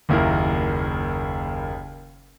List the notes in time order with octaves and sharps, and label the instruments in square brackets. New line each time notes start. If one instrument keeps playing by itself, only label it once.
[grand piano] F#1 D#2 E4 A#4